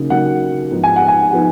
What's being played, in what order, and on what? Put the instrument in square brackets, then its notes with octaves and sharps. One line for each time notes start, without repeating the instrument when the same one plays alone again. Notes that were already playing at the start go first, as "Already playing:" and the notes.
Already playing: [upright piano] C#3 F#3 A#3 D#4
C#3 F#3 A#3 D#4 F#5
G#2 F3 B3 D#4
G#5
F#5
G#5
F3 B3 D#4 F#5